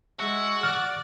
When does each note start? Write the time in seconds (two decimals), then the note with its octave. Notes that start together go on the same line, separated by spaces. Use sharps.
0.20 G#3 F#4 E5
0.63 D5 F#5 F6